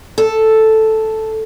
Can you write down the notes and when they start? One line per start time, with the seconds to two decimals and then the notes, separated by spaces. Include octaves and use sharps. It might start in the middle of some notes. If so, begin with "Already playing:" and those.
0.18 A4